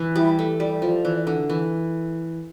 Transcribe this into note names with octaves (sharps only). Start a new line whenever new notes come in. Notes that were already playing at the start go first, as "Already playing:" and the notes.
Already playing: E3
G3 E4
A3
G3 D5
F3
E3
D3
E3